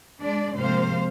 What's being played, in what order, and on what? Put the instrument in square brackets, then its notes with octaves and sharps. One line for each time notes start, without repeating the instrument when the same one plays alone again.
[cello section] G#3 D4 D5
G#2 C3 F3 A#3 C5 F5